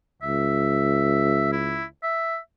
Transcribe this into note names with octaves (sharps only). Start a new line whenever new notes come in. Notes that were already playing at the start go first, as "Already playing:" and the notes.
C#2 E5
E4
E5